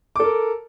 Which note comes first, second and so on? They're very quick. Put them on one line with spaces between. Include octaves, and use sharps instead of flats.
D6 A4 A#4